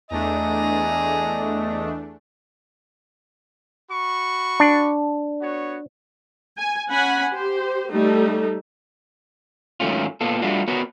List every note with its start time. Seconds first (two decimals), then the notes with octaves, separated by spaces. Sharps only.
0.11 E2 A3 D4 G#4 D#5 A#5
3.90 F#4 B5 C#6
4.60 D4
5.41 B3 F#4 C#5
6.57 G#5
6.90 C#4 F#5 G#5 B5
7.29 G4 C5
7.91 G3 A3 D#4 A4
9.80 G#2 D#3 F#3 A3 C#4 F4
10.21 A#2 B3 F4 A4
10.42 G3 A3 D4 F4 F#4
10.68 B3 F#4 A#4 C#5